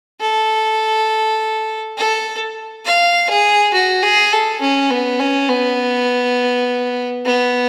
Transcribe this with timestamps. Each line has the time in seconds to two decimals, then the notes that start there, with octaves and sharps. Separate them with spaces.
0.20 A4
1.97 A4
2.85 F5
3.29 G#4
3.73 F#4
4.03 G#4
4.32 A4
4.61 C#4
4.90 B3
5.19 C#4
5.49 B3
7.25 B3